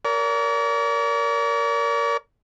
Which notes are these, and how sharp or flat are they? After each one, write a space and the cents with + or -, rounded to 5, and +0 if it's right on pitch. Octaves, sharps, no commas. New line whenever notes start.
A#4 +0 D5 -45